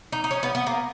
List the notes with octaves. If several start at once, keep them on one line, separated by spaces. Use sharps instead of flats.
D#4
D#4
C#4
B3
B3
A#3